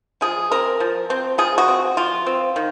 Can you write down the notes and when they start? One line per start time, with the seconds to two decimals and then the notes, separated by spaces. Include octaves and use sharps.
0.21 F3 G#4
0.51 C4 A#4
0.80 F3
1.10 C4
1.38 F3 G#4
1.58 F#4
1.68 C4
1.97 F3 F4
2.26 C4
2.56 D#3